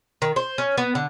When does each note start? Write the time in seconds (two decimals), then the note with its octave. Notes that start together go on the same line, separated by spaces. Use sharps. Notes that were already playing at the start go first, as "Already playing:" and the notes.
0.22 D#3
0.36 C5
0.58 C#4
0.78 B3
0.95 D3